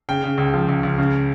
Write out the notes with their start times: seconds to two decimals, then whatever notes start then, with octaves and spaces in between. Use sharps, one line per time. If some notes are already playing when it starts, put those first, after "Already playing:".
0.09 C#3 G5
0.24 C#3
0.38 C#2
0.54 F3
0.69 C#2
0.83 C#2
0.98 C#3